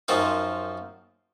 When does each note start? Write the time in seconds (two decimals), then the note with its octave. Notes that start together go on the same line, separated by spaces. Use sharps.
0.08 F#2 F3 C4 D#4 A#4